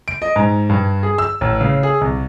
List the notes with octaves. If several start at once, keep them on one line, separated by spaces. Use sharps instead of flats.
D7
D#5
G#2
G2
G#4
E6
A1
C#3
G#4
C2